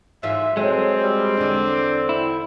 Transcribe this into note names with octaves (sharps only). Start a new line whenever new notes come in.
G#2 E3 F4 E5
F#3 G#3 C4 A4
G3
E2 D3 D4
E4